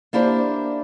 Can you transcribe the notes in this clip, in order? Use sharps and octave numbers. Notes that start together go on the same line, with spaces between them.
A#3 D4 E4 G4 C5